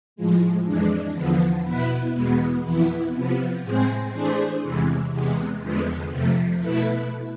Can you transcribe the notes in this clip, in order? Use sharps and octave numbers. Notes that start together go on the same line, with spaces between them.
A2 F3 G#3
F2 E3 G#3 D4
E2 D3 F3 B3
B2 B3 E4 B4
E2 B2 G#3 B3
F2 E3 B3 E4
C3 F3 B3
A2 G#3 C4 G#4 C5
E3 A3 D4 G#4 C5
E2 C3 E3 G#3
E2 C3 G#3 B3
E2 D3 F3 G#3 B3
F2 C3 F3 A3
B2 A3 E4 B4